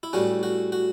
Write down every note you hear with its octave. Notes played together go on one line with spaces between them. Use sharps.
E4
A2 G3 C#4 F#4
F#4
F#4